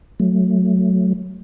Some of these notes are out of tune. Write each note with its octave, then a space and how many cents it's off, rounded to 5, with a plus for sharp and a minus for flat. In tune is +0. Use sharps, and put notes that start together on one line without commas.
F#3 +0 A3 +0